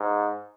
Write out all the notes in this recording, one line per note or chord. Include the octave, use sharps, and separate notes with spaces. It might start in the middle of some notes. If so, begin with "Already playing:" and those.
Already playing: G#2